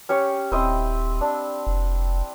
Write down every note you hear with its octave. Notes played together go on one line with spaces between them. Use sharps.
C#4 G4 C#5
D#1 C4 E4 D#5
D4
F1